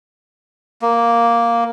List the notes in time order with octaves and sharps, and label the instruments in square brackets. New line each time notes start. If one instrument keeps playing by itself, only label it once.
[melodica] A#3